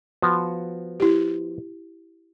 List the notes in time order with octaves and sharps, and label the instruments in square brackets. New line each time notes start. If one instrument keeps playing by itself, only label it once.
[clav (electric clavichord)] F3 B3 F#4
[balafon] E4 G4